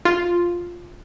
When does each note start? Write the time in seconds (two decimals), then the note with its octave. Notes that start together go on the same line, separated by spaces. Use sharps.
0.05 F4